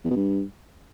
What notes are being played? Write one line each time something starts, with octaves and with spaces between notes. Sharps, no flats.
E2
B2
G2